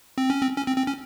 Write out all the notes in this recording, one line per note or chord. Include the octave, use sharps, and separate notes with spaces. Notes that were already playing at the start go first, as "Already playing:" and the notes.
C4
C#4
C4
C#4
C4
C4
C#4